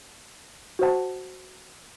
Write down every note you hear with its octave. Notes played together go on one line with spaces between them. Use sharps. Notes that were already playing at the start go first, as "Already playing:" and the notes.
F#4 C5 F#5 A5